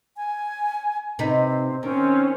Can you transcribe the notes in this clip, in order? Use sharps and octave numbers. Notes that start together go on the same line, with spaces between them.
G#5
C3 C4 D#4 B4
D#3 C4 C#4